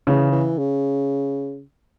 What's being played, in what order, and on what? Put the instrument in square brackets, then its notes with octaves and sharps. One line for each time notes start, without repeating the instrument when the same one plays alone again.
[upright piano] C#3 [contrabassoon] E3
[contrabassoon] E3
C#3